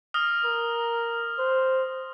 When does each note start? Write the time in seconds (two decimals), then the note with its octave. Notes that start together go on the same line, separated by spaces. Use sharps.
0.14 D#6 F6 A#6
0.45 A#4
1.39 C5